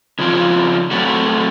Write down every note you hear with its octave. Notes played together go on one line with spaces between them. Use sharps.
C#3 F3 C4 F4
F#3 A3 C4 F#4